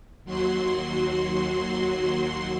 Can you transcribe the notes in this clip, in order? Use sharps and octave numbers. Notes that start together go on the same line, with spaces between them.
D#2 F#3 F#4 C6